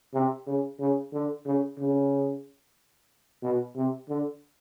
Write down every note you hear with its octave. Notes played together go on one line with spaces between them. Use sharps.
C3
C#3
C#3
D3
C#3
C#3
B2
C3
D3